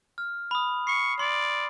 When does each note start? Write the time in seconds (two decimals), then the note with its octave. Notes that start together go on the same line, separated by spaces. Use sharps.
0.18 F6
0.51 B5 D#6
0.87 C#6 C7
1.19 D5 C6